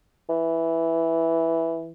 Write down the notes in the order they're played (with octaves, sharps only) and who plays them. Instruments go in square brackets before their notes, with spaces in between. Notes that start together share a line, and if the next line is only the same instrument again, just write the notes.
[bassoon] E3